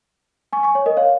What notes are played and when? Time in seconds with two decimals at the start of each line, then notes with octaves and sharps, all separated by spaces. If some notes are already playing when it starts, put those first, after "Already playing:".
0.53 G#5 C#6
0.63 G#5 C#6
0.75 C#5
0.86 A#4 D#5
0.97 C#5 F5